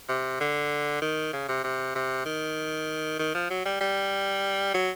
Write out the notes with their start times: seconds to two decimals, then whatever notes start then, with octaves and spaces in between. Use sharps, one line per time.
0.09 C3
0.40 D3
1.02 D#3
1.33 C#3
1.48 C3
1.64 C3
1.95 C3
2.26 D#3
3.19 D#3
3.35 F3
3.50 F#3
3.65 G3
3.81 G3
4.74 F#3